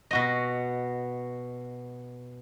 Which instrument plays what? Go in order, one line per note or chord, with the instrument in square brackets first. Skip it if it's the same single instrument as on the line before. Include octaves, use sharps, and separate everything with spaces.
[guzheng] B2 F#4 D#5